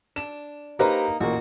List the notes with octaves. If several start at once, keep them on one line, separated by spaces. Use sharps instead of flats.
D4 E7
A#3 D#4 G4 B4 C5
A1 A#2 A#3 F#4